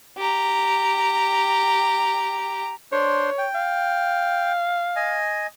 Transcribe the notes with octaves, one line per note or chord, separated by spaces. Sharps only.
G4 A#5
D4 C5 C#5 C6
G5
F5
D#5 G#5